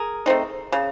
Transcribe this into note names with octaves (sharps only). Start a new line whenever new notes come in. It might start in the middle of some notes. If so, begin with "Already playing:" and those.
Already playing: G#4 A#4
A3 C4 D#4
C#3